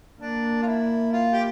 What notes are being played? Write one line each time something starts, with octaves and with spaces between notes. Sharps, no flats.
A#3 D4
F4
E4
F4
G4